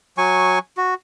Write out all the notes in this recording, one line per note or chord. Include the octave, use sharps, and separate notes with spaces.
F#3 G#5 C#6
F#4